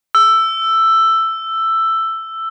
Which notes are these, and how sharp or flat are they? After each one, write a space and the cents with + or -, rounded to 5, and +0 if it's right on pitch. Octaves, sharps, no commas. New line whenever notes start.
E6 +10